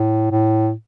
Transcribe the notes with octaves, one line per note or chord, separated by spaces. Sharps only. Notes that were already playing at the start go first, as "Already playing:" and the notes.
Already playing: A2
A2